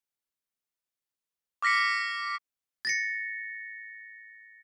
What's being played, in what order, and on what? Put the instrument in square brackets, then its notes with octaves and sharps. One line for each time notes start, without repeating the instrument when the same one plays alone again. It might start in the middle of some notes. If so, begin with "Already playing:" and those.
[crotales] D6 F6 A#6 B6 C#7
[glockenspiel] A6 A#6 C#7